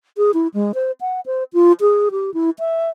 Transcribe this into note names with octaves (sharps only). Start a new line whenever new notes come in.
G#4
E4
G#3
C5
F#5
C5
F4
G#4
G4
E4
E5